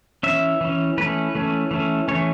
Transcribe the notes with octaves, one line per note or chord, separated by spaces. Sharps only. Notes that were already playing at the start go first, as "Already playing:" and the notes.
E3 C#4 E5
E3 C#4
E3 A3 C#4 B4
E3 A3 C#4
E3 A3 C#4
E3 A3 C#4 C#5